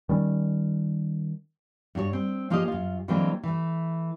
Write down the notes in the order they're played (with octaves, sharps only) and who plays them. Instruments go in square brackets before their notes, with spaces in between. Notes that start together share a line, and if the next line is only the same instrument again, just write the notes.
[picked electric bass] D#3 G3 C#4
[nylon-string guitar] G2 F#4 G#4 C#5
C4
F3 A#3 F4 G4 G#4 D#5
F#2 F4
D3 E3 F#3 G#3 A#3 C4
E3 A3